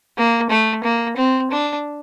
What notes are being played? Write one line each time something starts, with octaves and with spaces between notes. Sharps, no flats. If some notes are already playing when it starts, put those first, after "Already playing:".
A#3
A3
A#3
C4
D4